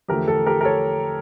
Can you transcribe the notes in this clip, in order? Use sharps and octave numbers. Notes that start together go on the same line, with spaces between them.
E2 D3 F3 A3 G4 A#4
A4
G4 A#4
A#4
A4 C#5